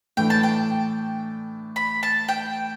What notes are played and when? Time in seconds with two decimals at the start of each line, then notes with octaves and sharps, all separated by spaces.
0.17 A2 E3 A3 D4 G5
0.30 A5
0.43 G5
1.76 B5
2.03 A5
2.28 G5